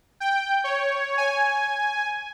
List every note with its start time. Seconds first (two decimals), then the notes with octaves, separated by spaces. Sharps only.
0.20 G5
0.64 C#5
1.17 G#5